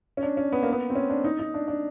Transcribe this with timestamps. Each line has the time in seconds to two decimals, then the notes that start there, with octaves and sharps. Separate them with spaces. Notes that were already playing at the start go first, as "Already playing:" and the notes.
0.17 C#4
0.23 D4
0.37 C#4
0.52 B3
0.63 A#3
0.72 B3
0.90 C4
0.95 C#4
1.10 D4
1.24 D#4
1.39 D#4
1.54 D4
1.68 D4